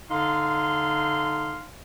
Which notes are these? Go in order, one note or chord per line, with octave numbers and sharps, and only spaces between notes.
D3 D#4 F5 C6